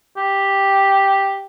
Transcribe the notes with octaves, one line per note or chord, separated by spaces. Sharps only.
G4